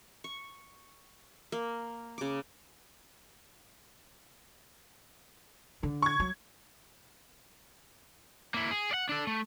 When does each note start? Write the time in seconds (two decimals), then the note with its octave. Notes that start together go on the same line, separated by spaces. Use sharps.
0.24 C#6
1.52 A#3
2.18 C#3 D6
5.83 D3
6.02 C#6 G#6
6.20 F#3
8.54 A#3 E4
8.71 G#4
8.91 D5 F#5
9.09 D4 A4
9.27 A3